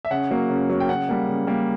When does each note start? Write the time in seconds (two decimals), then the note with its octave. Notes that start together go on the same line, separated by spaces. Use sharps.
0.05 E5
0.11 C#3 F#5
0.31 F#3 A#3
0.50 C#3
0.70 F#3 A#3
0.80 G5
0.89 C#3 F#5
1.09 G3 A#3
1.28 C#3
1.47 G3 A#3